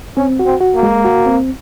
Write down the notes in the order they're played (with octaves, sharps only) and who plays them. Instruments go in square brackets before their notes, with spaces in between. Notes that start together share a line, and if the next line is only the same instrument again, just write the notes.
[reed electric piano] C4 [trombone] C#4
[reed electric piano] F#4
[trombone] C4
[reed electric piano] F#4
[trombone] A#3
[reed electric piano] G#3
F#4
C4